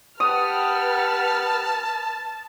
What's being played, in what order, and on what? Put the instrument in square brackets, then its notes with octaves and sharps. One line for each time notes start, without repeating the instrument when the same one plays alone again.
[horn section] G4 F#5 G5 [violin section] B4 F6 [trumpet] A5 [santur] D#6